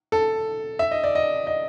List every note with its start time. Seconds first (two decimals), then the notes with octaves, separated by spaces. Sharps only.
0.12 A4
0.79 E5
0.91 D#5
1.04 D5
1.15 D#5
1.47 D#5